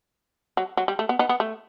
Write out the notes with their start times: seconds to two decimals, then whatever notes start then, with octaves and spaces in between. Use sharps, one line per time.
0.57 F#3
0.77 F#3
0.88 G3
0.99 A3
1.09 B3
1.19 B3 D#4
1.29 B3
1.40 A3